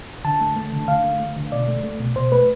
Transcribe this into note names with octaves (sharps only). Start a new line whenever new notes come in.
D3 A5
A3
A3
D3
D3 F5
A3
A3
D3
B2 D5
A3
A3
B2
B2 C5
A3 B4